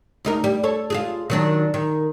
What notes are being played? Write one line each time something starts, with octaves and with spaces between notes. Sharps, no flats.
D2 D#4 A#4
G3
A4 C#5
F4 F#4 G#4
D#3 F#3 D4
D#3